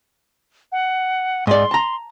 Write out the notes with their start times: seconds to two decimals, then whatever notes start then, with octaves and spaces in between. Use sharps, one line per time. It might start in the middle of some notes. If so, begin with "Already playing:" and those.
0.72 F#5
1.47 G#2 D5 C6
1.71 A5 A#5